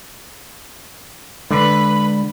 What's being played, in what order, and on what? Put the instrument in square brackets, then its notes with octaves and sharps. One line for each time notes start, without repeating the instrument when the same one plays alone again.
[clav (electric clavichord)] D3 [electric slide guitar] G#3 D5 [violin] B4 [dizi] B5